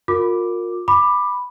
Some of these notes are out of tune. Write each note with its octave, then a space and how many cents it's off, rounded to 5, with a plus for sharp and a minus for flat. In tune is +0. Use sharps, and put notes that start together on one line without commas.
F4 +35 A#4 -20 D6 +0
B5 +0 D6 +15